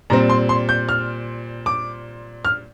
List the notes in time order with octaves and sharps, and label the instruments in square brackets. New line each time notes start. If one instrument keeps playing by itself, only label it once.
[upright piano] A#2 G3 C4 A#5
C6
C6
G6
F6
D6
F6